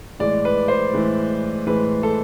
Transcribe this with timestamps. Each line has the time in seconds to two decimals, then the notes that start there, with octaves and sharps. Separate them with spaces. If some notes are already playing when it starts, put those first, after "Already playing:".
0.20 A2 E3 G#3 D5
0.45 B4
0.68 C5
0.93 A2 E3 G#3
1.66 A2 E3 G#3 B4
2.03 A4